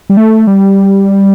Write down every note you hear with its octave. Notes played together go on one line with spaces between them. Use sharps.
G3
A3
G3